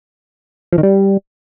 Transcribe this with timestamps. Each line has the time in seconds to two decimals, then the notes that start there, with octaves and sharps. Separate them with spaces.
0.73 F3
0.78 D#3
0.83 G3